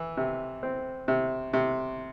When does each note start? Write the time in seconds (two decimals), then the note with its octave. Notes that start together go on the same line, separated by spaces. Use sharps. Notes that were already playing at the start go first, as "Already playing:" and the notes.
Already playing: E3
0.17 C3
0.63 C4
1.08 C3
1.53 C3